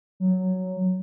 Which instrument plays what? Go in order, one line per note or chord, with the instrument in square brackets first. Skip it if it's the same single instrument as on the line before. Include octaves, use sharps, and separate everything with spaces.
[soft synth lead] F#3